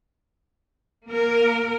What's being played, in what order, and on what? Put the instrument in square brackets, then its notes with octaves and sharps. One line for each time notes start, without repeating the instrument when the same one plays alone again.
[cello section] A#3 A#4